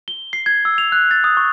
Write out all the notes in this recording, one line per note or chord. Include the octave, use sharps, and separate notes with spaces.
G7
C7
G#6
E6
F7
F#6
A6
D#6
C#6